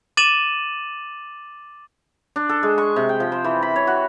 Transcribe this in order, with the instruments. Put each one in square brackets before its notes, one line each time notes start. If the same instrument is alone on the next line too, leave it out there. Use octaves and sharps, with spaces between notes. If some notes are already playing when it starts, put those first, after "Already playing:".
[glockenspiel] D6 A6 D#7 E7 F#7
[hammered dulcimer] D4
A4
G#3
C#6
C3
G5
F3
C5
E3
B5
C#5
F#4